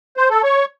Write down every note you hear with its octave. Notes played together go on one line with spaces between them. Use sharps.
C5
A4
C#5